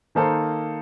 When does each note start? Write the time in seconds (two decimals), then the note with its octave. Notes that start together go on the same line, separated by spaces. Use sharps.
0.15 D#3 A#3 D#4 A4 C5